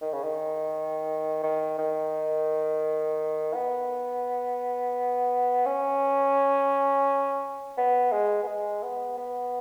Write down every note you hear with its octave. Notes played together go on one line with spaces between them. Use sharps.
D#3
C#3
D#3
D#3
D#3
B3
C#4
B3
G#3
B3
G#3
B3
B3